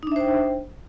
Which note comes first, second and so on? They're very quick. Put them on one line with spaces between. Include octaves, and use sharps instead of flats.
D#4 D4 E5 C5 G5